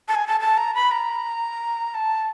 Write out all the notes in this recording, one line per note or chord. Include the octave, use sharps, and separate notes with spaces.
A5
G#5
A5
A5
A#5
B5
A#5
A5